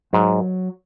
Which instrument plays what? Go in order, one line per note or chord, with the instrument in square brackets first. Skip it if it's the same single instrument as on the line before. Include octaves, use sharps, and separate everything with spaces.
[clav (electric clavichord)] G#2 [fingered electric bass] F#3